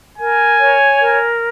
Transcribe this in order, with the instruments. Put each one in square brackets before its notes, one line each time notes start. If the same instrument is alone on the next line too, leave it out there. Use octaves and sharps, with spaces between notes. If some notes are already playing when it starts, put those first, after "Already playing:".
[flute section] A#4 [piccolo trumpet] G#5
[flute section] C#5
A#4